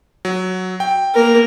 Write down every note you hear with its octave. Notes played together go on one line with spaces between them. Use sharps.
F#3
G5
A#3 A#4